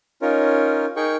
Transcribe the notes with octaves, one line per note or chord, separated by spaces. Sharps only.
C#4 D#4 F4 A#4 C#5
D#4 G#4 A#4 G5 C#6